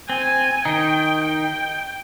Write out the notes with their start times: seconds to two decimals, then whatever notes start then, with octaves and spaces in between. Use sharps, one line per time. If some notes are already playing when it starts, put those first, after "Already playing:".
0.09 C4 G#5
0.65 D#3 D#4 G5
1.22 G5